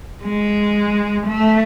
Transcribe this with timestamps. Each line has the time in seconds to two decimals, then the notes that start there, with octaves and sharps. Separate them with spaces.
0.24 G#3
1.26 A3